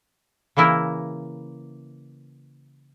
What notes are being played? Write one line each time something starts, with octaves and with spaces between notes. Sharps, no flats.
C#3 E3 A#3 E4 A#4